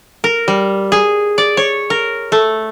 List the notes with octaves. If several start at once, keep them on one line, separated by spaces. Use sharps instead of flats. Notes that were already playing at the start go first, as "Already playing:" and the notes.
A#4
G3
G#4
D5
C#5
A#4
A3